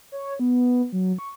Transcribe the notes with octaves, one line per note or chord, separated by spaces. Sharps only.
C#5
B3
F#3
C#6